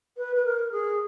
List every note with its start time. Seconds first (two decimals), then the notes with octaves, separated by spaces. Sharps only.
0.17 B4
0.36 B4
0.45 A#4
0.72 G#4